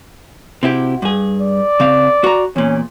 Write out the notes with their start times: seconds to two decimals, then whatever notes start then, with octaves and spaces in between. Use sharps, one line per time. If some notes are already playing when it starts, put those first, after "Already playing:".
0.63 C3 E4 F#4 G4
1.02 G2 G#4
1.41 D5
1.80 C#3 C4 F5
2.24 F#4 A#5
2.56 E2 A#2 C#4